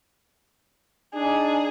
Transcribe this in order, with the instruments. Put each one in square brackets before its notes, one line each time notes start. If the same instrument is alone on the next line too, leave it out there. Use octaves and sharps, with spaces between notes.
[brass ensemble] D4 D#4 [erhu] G#4